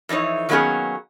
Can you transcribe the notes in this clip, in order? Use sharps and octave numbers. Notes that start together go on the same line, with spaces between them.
F2 E3 D4 D#4 C#5
D#3 F#3 A#3 B3 C#4 G#4